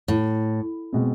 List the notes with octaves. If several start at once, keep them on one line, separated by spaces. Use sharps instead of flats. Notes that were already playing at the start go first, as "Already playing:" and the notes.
A2
B2 G#3 C4